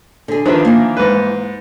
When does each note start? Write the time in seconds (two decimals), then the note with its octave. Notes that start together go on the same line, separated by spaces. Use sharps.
0.28 D3 G#4
0.45 D#3 F3 D4 B4 E5
0.65 E3 A#3
0.97 G#2 B4